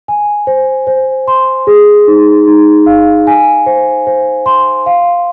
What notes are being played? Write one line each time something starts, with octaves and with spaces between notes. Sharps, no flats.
G#5
C5
C5
C6
G#4
D#4
D#4
F5
G#5
C5
C5
C6
F5